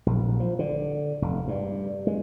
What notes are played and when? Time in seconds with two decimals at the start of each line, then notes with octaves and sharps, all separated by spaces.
0.06 A#1
0.40 F3
0.59 D3
1.22 F1
1.48 G2
2.07 G#3